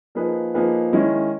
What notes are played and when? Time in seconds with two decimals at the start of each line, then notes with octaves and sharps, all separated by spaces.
0.15 F3 A#3 D#4 G#4 B4
0.54 F3 A#3 D#4 G#4 B4
0.93 D#3 G#3 C#4 E4